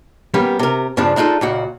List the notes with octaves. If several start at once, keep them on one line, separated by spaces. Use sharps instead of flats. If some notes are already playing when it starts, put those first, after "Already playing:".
G3 A#3 B3 C#4
C3 A#4
G2 C#3 F3 D4
G#3 D4 D#4 F4 A4
C#2 A#2 F#4